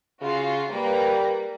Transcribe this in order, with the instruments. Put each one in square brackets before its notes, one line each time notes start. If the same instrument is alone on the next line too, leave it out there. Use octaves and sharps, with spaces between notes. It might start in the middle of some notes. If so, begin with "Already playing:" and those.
[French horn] C#3 [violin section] F4 F#4
[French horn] G3 [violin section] A#3 B4 A#5